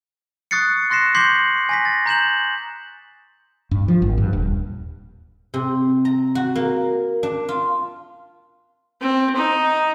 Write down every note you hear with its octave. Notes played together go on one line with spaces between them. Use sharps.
C#6 D#6 F#6 A6 C7 C#7
C6 F#6 A#6 C7 E7
C6 D6 G6 B6 C7 F#7
G#5 A#6 B6
A6
A#5 G6 E7 F#7
G2
F3
G#1
G2
D#1
C3
A#5
F#4
A#3
D4
F4
C4
D#4